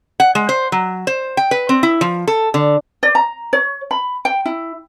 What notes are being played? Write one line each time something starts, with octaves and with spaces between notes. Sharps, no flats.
F#5
G#3
C5
F#3
C5
G5
B4
C4
E4
F3
A4
D3
D5
A#5
C#5
B5
G5
E4